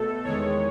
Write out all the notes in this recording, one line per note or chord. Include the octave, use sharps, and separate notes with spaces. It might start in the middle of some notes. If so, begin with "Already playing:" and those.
Already playing: B2 A3 A4
E2 D#3 G#3 C#5